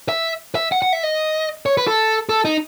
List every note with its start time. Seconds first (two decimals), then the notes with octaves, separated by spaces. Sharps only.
0.09 E5
0.55 E5
0.72 F#5
0.82 F#5
0.93 E5
1.03 D#5
1.66 C#5
1.77 B4
1.87 A4
2.29 A4
2.45 D#4